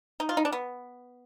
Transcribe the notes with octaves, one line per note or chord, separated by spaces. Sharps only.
D#4
F4
D#4
D4
B3